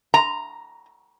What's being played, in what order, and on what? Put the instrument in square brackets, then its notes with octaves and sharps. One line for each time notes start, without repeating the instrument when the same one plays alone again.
[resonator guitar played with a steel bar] A#5